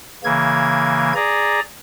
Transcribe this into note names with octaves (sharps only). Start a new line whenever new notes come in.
C#3 E3 A#3 G#6
G#4 D5 A#5